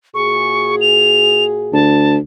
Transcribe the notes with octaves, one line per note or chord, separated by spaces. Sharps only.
A#2 F#4 G#4 C#6
F7
D2 A5